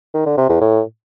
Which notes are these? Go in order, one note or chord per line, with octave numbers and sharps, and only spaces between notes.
D#3
D3
C3
E2
A2